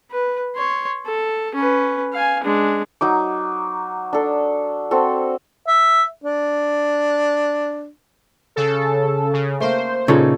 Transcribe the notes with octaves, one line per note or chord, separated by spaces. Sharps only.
B4
C#5 C6
A4
C#4 B4
F5 G#5
G#3 D4
F#3 D#4 D6
D4 A4
C4 F#4 A4
E5
D4
C#3 A4
C#3
A3 A#3 C5
A#2 C#3 D#4 A4 C#5